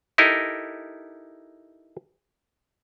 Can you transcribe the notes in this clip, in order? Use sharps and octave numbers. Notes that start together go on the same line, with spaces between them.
D#4 E4 G4 A4 A#4 D#5